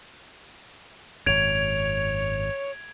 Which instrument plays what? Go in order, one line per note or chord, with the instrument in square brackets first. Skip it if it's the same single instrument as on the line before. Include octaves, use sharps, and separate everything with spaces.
[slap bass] G#1 F#2 [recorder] C#5 [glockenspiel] G#6 D7 F7